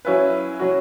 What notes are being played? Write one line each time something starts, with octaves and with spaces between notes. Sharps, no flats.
F#3 C#4 E4 B4
F#3 C#4 F#4